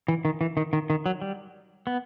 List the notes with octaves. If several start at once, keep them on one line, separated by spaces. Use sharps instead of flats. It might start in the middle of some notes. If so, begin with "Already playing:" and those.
E3
D#3
E3
D#3
D#3
D#3
F#3
G3
B3